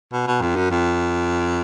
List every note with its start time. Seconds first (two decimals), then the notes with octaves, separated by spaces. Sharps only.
0.13 B2
0.27 B2
0.42 F2
0.56 F#2
0.71 F2